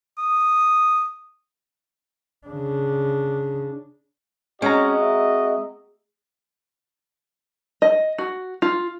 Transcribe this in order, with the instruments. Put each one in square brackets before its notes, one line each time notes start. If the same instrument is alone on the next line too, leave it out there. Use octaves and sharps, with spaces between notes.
[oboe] D#6
[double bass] C#3 D4
[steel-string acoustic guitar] G#3 [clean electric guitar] C4 A#5 [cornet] C#4 [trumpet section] F#4 D#5
[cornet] E5
[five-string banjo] D#5
F#4
F4